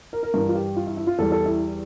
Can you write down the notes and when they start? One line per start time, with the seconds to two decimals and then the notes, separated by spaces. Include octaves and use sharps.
0.13 A#4
0.23 A#4
0.34 G2 E3 G3 A#4
0.49 F4
0.55 G4
0.76 F4
0.87 E4
0.97 E4
1.07 F4
1.18 E2 E3 G3 A4
1.32 A4
1.46 E4